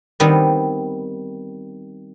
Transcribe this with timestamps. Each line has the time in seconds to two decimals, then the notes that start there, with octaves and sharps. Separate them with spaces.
0.20 D#3 G3 B3 C4